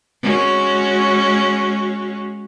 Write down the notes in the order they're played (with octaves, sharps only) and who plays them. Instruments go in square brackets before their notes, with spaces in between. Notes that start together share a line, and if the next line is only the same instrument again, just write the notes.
[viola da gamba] G#3 C#4 F#4